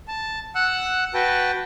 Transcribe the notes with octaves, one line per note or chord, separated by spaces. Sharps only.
A5
F#5 E6 F#6
F#4 B4 G5 A5